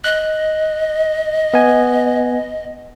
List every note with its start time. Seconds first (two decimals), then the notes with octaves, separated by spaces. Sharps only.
0.04 D#5 F#6
1.54 B3 G#5